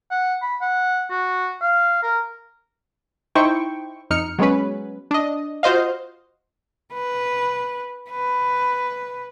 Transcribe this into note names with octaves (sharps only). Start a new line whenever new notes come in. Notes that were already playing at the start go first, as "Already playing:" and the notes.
F#5
B5
F#5
F#4
F5
A#4
D#4 E4 C5 G5 C#6
F2 D#4 F6 C#7
F#3 G#3 B3 C#4 B4
D4 D#5
F4 F#4 C5 D#5 F5
B4
B4